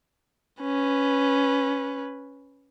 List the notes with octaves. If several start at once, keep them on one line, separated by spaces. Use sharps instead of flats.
C#4 B4